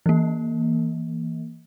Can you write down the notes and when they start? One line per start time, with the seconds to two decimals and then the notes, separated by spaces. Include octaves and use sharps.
0.06 E3 A#3